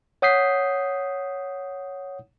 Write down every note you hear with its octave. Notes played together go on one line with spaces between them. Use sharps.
C#5 F#5 D#6 G6 B6 C7